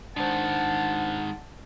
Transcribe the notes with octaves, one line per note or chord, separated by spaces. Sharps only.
G#2 D#3 D4 C5 F#5 A5